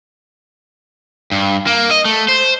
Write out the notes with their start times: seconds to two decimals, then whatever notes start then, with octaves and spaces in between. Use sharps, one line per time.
1.32 G2
1.67 A#3
1.91 D#5
2.05 A3
2.28 C5